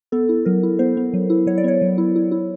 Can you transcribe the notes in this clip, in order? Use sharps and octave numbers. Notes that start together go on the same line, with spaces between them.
B3 A4
E4
F#3 A#4
E4
B3 C5
B3
F#3
E4
F#3 C#5
D5
B3 C#5
F#3
E4
E4
E4